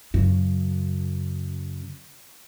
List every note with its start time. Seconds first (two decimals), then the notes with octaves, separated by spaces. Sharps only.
0.14 F#2 C#3